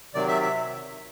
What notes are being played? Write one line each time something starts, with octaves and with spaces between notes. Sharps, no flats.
C3 D#3 F#3 D5
E5
E5